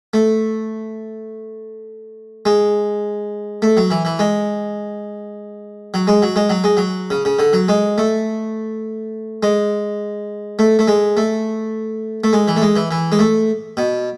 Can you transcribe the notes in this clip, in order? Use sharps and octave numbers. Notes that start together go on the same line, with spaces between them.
A3
G#3
A3
F#3
E3
E3
G#3
F#3
G#3
F#3
G#3
F#3
G#3
F#3
C#3
C#3
D3
F#3
G#3
A3
G#3
A3
A3
G#3
A3
A3
G#3
E3
A3
G#3
E3
E3
G#3
A3
B2